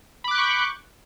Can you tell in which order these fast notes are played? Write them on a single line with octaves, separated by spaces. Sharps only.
B5 D6 F#6 G6 C#6